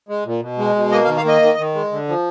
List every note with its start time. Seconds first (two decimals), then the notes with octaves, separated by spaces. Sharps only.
0.09 G#3
0.25 A#2
0.41 B2
0.58 G#3
0.76 B2
0.92 A#3 D#5
1.04 F5
1.08 D#3
1.17 F5
1.25 A#3 D#5
1.42 D#3
1.59 D#3
1.75 G#3
1.92 D3
2.08 F3